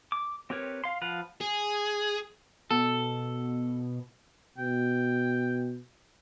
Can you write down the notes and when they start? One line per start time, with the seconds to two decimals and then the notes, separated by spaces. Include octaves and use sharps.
0.12 D6
0.50 C4 G4 A#4 B4 C#5
0.84 F5 C6
1.01 F3 B4 F5 F#5
1.41 G#4
2.71 B2 A4
4.58 B2 G5